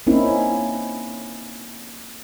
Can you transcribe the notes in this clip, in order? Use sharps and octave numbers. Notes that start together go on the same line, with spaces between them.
A#3 C4 C#4 D#4 E4